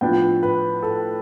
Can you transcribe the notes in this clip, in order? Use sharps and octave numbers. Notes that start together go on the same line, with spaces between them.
A2 F3 B3 D4 G5
B4
A4